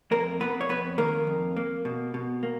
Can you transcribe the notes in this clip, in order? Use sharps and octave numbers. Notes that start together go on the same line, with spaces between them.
F2 A#3 A#4
A#3 B3 B4
C#5
F2 B3 B4
D#3 A#3 A#4
F2
A#3
B2
B2
A#3